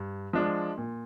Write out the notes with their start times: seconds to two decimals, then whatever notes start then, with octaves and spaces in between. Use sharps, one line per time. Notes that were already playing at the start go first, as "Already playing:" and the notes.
Already playing: G2
0.33 F3 G#3 D4
0.78 A#2